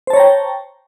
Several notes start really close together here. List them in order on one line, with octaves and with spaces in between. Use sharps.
C5 A5 C#5 A#5 G5